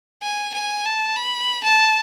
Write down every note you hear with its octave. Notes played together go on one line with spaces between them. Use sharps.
G#5
G#5
A5
B5
A5